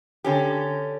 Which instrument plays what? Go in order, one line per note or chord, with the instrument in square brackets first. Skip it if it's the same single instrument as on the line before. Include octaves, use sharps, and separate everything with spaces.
[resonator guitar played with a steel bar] D3 C#4 G4